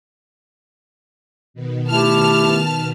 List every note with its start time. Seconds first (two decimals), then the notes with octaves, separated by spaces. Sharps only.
1.54 B2 D#3 B3
1.89 A3 E4 G4 A5 F6